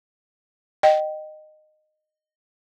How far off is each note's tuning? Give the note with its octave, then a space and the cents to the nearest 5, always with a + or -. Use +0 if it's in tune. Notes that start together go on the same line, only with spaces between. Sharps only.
D#5 -15 G5 -20